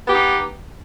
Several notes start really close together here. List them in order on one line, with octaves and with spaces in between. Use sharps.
B3 G4 D#4